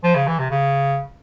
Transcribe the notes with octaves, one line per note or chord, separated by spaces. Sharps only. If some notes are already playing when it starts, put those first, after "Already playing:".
F3
C#3
E3
C3
C#3